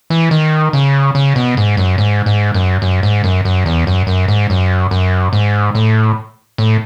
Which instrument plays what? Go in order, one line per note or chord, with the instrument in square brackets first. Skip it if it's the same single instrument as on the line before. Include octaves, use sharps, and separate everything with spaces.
[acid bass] E3
D#3
C#3
C#3
B2
G#2
F#2
G#2
G#2
F#2
F#2
G#2
F#2
F#2
E2
F#2
F#2
G#2
F#2
F#2
G#2
A2
A2